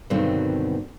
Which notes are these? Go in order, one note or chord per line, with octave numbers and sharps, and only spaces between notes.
G2 B2 D3 D#3 F#3 C4